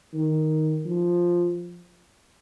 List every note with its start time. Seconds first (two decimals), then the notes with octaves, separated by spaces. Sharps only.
0.13 D#3
0.85 F3